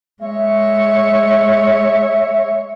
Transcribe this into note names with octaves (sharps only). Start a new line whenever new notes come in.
G#3 C#5 E5